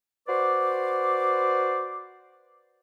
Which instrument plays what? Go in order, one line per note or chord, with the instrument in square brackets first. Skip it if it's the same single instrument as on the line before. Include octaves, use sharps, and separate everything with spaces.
[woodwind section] F#4 B4 C5 D5 C6 D6